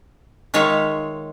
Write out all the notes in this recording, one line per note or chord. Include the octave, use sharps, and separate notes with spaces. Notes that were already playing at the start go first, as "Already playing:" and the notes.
D#3 G#3 F4 C#5 E5